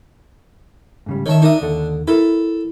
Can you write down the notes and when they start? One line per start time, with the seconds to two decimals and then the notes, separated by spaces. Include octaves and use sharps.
1.06 G#2 C#3 G3
1.26 D#3 C#5 E5 A5
1.42 D4 D#4 A#4 E5 D#6
1.61 D#2 D3 A4
2.08 E4 A4 A#4